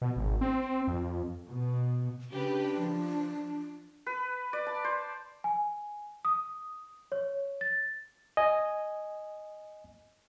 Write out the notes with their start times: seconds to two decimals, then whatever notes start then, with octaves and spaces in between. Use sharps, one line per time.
0.02 B2
0.17 G#1
0.41 C4
0.88 F2
1.48 B2
2.32 C#3 D4 G4 B4
2.76 F3
4.06 B4
4.53 D5
4.67 A5
4.84 C5
5.44 G#5
6.25 D#6
7.12 C#5
7.61 A6
8.37 D#5 G#5